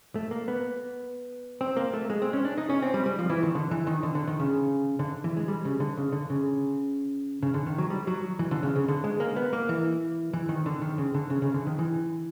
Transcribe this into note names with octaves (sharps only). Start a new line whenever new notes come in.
A3
A#3
B3
C4
A#3
A3
G#3
C4
C#4
D4
D#4
C#4
C4
G3
G3
F3
E3
D#3
D3
E3
D#3
D3
D3
D#3
C#3
D3
E3
G#3
G3
C#3
D3
C#3
D3
C#3
C#3
D3
D#3
F#3
G3
F#3
E3
D3
C#3
C#3
D3
G#3
A#3
B3
A#3
E3
E3
D#3
D3
D#3
C#3
D3
C#3
C#3
D3
D#3
E3